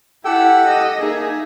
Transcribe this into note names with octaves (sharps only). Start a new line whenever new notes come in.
E4 G4 A4 F#5 E6
D#5
A#3 D#4 G#4 E5